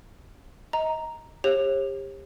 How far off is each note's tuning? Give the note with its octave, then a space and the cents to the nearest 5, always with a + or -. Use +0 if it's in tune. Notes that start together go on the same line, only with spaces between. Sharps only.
D#5 +25 A#5 +0
G4 +30 C#5 -45